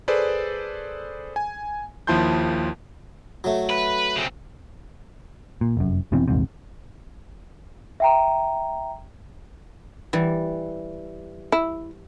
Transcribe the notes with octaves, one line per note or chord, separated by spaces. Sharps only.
G#4 A4 B4 C5 D5
G#5
D#2 F3 E4 A5 C6 G6
F#3 A3
B4
C#3 C4
A#2
F1 F#2
F1 B2 E3 C4
A#1 E2 G#2 C3
E5 G5 A#5
E3 G3
E4